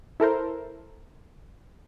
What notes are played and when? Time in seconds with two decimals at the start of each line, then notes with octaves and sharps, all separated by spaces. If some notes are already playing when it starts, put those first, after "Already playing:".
0.20 E4 A4 A#4 C5